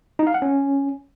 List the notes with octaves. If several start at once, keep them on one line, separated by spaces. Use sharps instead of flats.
D#4
F5
F#5
C#4